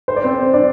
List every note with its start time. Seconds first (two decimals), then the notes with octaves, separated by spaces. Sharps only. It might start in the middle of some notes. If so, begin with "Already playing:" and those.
0.08 C5
0.16 D5
0.24 C4 C5
0.54 D4 D5